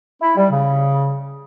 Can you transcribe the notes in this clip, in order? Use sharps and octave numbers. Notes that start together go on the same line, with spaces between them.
E4
G3
C#3